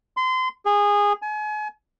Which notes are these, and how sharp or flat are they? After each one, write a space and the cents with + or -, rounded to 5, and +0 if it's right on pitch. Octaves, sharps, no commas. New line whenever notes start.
C6 -30
G#4 -20
G#5 +35